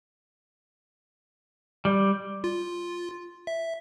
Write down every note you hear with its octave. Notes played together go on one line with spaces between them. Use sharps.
G3
F4
E5